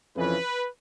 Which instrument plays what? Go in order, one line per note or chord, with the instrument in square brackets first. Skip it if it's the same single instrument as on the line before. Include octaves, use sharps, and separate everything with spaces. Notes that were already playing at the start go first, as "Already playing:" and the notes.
[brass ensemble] F2 C#3 E3 B4